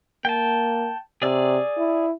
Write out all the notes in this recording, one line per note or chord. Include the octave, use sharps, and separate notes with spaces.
A#3 G5 A5
C3 G#4 D5 E6
E4